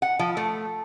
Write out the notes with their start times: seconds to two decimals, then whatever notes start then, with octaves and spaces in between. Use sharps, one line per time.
0.02 F#5
0.19 F3
0.37 A3